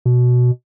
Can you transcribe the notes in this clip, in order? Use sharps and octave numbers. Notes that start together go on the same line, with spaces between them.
B2